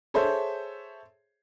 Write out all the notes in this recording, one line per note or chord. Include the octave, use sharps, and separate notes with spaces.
G#4 A4 C5 C#5 E5